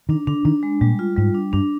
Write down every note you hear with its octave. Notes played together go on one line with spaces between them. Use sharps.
D#3 D4
D3 D4
D#3 D4
G#3
A#2 G3
F4
G#2 G3
D4
G2 D4